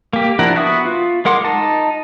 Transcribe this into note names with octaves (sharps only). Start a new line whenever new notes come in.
A#3 G4
F3 D4 E4 A#4 F#5
B3 F#4 E5 D#6 F#6
F4
G#3 A#4 F#5 C6 D6
D#4 A5